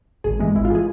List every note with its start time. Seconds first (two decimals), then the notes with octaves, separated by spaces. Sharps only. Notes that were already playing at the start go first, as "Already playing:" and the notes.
0.24 G#1 G#4
0.39 G#2 E3 G#3
0.55 G#1 E4
0.65 F4
0.70 E3 G#3 G#4